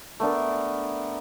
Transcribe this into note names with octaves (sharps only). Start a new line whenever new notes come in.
A3 B3 D4 A#4